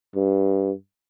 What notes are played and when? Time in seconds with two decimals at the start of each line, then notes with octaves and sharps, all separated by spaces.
0.16 G2